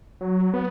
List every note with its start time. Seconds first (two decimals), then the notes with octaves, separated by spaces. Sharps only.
0.21 F#3
0.54 B3